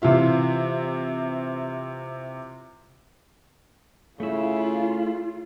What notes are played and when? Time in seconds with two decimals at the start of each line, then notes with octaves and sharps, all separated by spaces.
0.02 C3 E3 F4 E5
4.20 C#3 A3 E4 F4